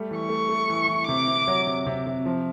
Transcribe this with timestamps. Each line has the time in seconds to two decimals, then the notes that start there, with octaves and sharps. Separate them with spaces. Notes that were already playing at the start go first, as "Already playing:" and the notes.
Already playing: G3 A3
0.11 E3
0.20 C#6
0.29 A3
0.49 A3
0.70 E3
0.88 E3
1.08 C3 D6
1.28 C3
1.48 F#3
1.67 C3
1.86 C3
2.06 C3
2.26 F3